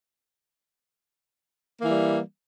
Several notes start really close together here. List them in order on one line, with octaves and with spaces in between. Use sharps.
A#3 E3 G3